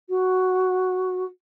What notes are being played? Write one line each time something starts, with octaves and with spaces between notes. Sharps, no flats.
F#4